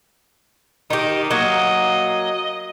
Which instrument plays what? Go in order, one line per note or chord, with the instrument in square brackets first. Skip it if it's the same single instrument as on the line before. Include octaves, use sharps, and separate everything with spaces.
[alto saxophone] D#3 [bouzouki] D#4 G4
[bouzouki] F#3 A#3 [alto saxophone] D#5